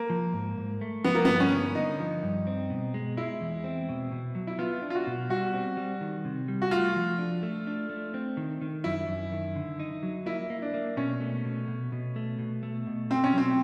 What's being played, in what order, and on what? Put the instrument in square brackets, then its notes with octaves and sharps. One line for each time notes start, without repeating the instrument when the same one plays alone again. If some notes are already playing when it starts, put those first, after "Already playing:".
Already playing: [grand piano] A#3
[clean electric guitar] F3
G#2
G#2
A3
[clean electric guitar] F3 [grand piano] B3
[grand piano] A#3
[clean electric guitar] G2 [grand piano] B3
[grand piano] C#4
[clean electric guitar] D3
[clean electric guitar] D3 [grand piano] D#4
[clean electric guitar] F3
G2
C4
B2
G#3
[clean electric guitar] G#3 [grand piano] E4
[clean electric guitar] E2
C4
B2
B2
F#3
[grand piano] E4
[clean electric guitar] B3 [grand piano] F4
[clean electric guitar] D4
[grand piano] F4
F#4
[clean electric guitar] B2
[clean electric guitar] G3 [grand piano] F#4
[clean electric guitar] C4
G3
D#3
C3
G3
[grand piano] F#4
[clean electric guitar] A3 [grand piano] F4
[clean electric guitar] F3
D4
A3
D4
A3
C4
D#3
D#3
[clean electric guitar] F#2 [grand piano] E4
[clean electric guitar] F#2
D#3
D3
D#4
F#3
[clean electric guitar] A#3 [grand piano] E4
[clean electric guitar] A#3
[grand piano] D4
[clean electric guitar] A#3
[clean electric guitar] B2 [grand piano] C#4
[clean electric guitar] A3
B2
B2
B2
A3
B2
A3
B2
[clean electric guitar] B2 [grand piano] C4
[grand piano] C#4
[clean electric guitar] F#3 [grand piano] C4